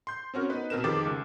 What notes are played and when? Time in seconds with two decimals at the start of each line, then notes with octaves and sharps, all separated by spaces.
0.07 C6 G6
0.34 C4 C#4 F#4 A#4
0.49 B3 D#4 B4 D#5
0.70 B2 C4 A#4 B4 E7
0.84 F2 D#3 G4 G#4 D6 A6
1.05 C#2